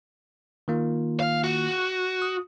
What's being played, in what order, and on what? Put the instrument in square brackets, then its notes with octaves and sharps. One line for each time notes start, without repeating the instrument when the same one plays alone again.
[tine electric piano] D#3 A#3 F4
[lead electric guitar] F5
F#4
[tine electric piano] D#6